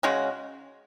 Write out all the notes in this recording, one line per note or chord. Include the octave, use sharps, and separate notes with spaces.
C#3 G#3 C#4 F#4